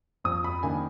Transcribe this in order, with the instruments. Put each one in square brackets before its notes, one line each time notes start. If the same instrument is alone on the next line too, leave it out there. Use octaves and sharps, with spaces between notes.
[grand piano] F2 D#6
B5
D#3 A#3 D4 G#5